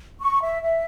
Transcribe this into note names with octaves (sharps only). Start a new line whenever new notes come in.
C#6
E5
E5